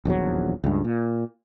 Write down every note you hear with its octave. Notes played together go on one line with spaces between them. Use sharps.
D#1 A#1 E2 F#3
C#2 G2
A#2